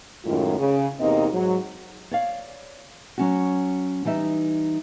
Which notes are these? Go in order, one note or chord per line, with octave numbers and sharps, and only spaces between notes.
F#2 A2 D#3 G#3 F4
C#3
E2 C3 A#3 C4 D#4 D#5
G#2 F#3
C#5 D5 F5
F#3 C#4 F#4
E3 G3 D#4 E5